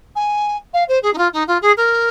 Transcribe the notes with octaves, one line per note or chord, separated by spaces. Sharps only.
G#5
F5
C5
G#4
D#4
F4
D#4
F4
G#4
A#4